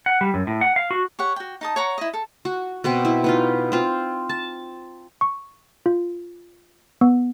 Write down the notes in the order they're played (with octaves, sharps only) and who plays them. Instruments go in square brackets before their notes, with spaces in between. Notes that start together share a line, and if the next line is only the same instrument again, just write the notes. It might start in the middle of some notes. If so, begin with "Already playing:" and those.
[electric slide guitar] F#5
G3
F#2
A2
F#5
F5
F#4
[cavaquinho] G4 C#5 F#5
F#4 G5
D#4 A5 D#6
C#5 F#5 A#5
E4 D#5
A4
[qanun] F#4
B2 B3 C4
E4
B3 D#4 F4
C4 F4
A5
[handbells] C#6
F4
B3